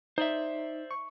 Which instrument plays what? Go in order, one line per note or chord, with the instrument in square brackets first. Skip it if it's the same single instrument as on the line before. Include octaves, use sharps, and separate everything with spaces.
[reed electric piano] D#4 [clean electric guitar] C5 D5 E5
[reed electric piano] C#6